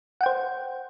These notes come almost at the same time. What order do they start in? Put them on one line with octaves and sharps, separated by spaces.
F#5 G5 C5